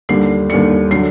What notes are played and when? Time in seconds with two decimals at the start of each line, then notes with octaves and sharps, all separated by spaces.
0.09 D#2 D3 G3 C7
0.49 D#2 D3 G3 C#7
0.91 D3 F#3 C7